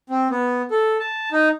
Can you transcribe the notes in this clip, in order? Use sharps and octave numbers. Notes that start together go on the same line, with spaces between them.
C4
B3
A4
A5
D#4